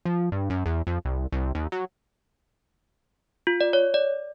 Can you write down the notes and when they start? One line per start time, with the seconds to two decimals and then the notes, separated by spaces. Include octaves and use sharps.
0.05 F3
0.32 G2
0.50 F#2
0.66 E2
0.87 F2
1.05 C2
1.32 C2
1.55 D#2
1.72 F#3
3.47 F4
3.61 D5
3.73 C#5
3.94 D5